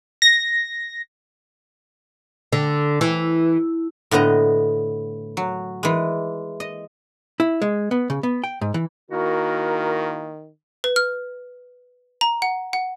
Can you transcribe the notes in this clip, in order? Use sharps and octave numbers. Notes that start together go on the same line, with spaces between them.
A#6
D3
E3
A2 D3 B3 D#5 A#5
F#3
E3 G#3
D#5
E4
G#3
B3
C#3
B3
G5
G#2
E3
D#3 A#3 E4 F#4 A#4
B4
F6
A#5
F#5
F#5